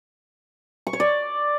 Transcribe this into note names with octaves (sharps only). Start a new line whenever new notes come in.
C#6
C#5
D5